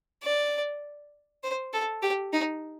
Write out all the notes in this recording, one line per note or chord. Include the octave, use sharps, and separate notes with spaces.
D5
C5
A4
G4
D#4